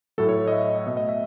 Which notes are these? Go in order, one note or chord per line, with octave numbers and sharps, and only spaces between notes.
A2 F#3 A3 A4
C#5
D#5
E5
D#5
D#5
B2 A3 D#5
D#5
E5